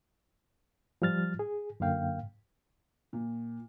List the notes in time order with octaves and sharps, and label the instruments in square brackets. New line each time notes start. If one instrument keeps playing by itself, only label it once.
[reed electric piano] F3 G3 F6 A6
G#4
F#2 D3 A#3 F5 G5
[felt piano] A#2